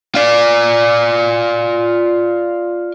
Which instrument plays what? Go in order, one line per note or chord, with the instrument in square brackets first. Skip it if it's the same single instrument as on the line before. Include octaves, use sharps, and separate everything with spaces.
[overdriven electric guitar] F4 D5